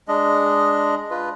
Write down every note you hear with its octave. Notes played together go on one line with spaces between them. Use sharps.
G#3 D4 D#5
F4 B4